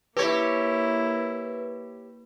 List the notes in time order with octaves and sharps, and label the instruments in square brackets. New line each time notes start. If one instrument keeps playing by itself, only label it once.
[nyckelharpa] A#3 E4 [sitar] G4 C#5 [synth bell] B4